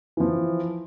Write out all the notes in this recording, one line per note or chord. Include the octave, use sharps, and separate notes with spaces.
E3 F3